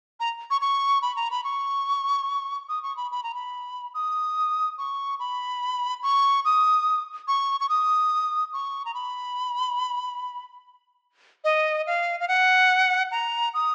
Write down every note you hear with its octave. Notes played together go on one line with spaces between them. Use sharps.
A#5
C#6
C#6
B5
A#5
B5
C#6
D#6
C#6
B5
B5
A#5
B5
D#6
C#6
B5
C#6
D#6
C#6
C#6
D#6
C#6
A#5
B5
D#5
F5
F5
F#5
A#5
D#6